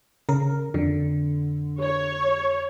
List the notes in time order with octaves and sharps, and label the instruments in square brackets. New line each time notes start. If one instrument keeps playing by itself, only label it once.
[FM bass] C#3 [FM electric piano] A#4
[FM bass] F2 [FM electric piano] D3
[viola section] C#5